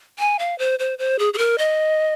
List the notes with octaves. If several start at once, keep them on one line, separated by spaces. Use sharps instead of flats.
G#5
F5
C5
C5
C5
G#4
G#4
A#4
D#5